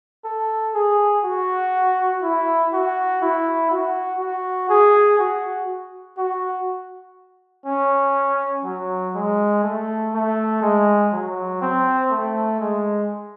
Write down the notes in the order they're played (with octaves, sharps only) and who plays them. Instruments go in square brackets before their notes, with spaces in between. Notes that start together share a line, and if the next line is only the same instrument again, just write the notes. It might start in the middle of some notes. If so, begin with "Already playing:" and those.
[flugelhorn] A4
G#4
F#4
E4
F#4
E4
F#4
F#4
G#4
F#4
F#4
C#4
F#3
G#3
A3
A3
G#3
F#3
C4
A3
G#3